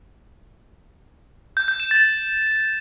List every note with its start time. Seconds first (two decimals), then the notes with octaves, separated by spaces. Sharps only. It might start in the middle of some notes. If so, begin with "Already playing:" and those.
1.57 G6
1.68 G6
1.80 E7
1.91 A6